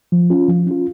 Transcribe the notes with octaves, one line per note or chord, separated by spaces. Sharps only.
F3
C#4 F4
F3
C#4 F4